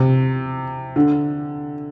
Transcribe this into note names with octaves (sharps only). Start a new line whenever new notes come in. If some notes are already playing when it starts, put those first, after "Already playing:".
Already playing: C3
D3